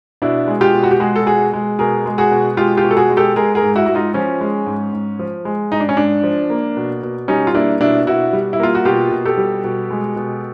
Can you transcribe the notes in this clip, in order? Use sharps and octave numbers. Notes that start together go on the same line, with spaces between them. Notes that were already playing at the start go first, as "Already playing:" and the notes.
B2 D4 E4
G#3
F4 G4
B2
F#4
G4
G#3 F#4 G#4
A4
B2 F#4 G#4
G#3
B2 G#4 A#4
G#3
F#4 G#4
B2
G#3 F4 G4
F4 G4
B2
A4
F#4 G#4
G#3
G4 A4
G#3 G#4 A#4
G#4 A#4
G#2
E4 F#4
G#2 F#4
D#4 F4
F3 C#4
G#3
G#2
G#2
F3
G#3
G#2 D#4
D4
C#4
G#2 D4
F3
A#3
B2
B2
G3 C#4 D#4
F4
A#3 D4 E4
B2 D4 E4
B2 E4 F#4
G3
E4
A#3 F4
F#4
B2 F4 G4
B2
G4 A4
G3
B2
G#3
B2